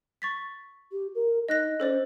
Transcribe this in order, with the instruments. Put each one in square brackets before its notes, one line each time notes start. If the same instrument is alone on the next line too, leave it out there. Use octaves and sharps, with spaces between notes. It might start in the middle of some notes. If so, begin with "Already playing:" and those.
[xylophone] C#6 A6 B6
[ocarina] G4
A#4
[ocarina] D#4 [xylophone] D#5 F#6 A#6
[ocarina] C#4 [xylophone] A4 C5 D5